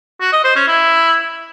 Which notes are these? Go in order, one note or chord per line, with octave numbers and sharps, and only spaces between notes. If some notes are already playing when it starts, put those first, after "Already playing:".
F#4
D#5
C5
C#4
E4